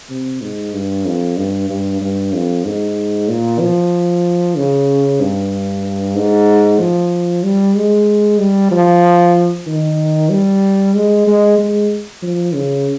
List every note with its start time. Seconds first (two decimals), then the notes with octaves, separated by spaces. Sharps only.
0.10 C3
0.42 G#2
0.73 G2
1.05 F2
1.37 G2
1.70 G2
2.01 G2
2.33 F2
2.65 G#2
3.29 A#2
3.60 F3
4.57 C#3
5.21 G2
6.16 G#2
6.80 F3
7.44 G3
7.75 G#3
8.39 G3
8.71 F3
9.67 D#3
10.31 G3
10.95 G#3
11.27 G#3
11.59 G#3
12.23 F3
12.54 C#3